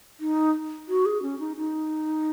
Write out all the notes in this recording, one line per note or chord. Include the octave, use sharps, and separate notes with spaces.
D#4
F#4
G#4
C#4
D#4
D#4